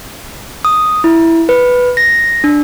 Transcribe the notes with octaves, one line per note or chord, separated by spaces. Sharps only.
D#6
E4
B4
A#6
D4